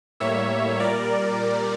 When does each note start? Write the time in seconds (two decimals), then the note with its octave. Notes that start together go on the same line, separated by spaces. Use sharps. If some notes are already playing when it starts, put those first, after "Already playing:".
0.20 A2 G3 A#3 C#5 E5
0.80 A#2 G3 A#4 D5